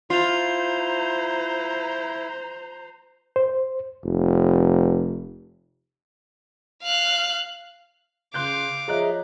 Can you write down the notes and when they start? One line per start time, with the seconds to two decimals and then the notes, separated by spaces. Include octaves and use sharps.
0.10 E4 F4 C5 A#5 C7 F7
3.36 C5
4.04 F1
6.83 F5 F#6
8.34 C#3 F5 C6 D6 F#6 G6
8.88 F3 G#4 C#5 D#5 E5 A#5 F#6